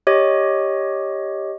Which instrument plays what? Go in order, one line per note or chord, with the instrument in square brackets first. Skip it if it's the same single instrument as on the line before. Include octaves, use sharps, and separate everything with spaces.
[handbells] G4 C#5 D#5